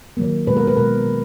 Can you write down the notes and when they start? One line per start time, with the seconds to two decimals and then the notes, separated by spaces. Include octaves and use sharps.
0.17 D#3 F#3 A#3
0.47 B2 G#3 B4
0.57 A#4
0.67 B4
0.76 B2 G#3 A#4
1.07 D#3